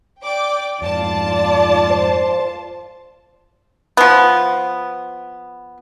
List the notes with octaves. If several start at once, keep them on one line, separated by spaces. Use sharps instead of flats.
D5 G5 D6
F2 G#2 F4 D5 A5
C5
F3 B3